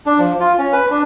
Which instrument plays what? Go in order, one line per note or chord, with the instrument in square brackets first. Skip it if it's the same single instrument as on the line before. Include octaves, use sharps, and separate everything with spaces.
[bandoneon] D4
F3
F4
C#4
B4
D4